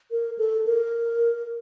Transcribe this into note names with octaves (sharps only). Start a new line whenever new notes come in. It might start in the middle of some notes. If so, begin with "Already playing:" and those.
A#4
A4
A#4